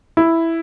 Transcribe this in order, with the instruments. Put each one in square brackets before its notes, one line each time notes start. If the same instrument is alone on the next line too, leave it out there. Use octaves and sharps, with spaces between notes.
[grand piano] E4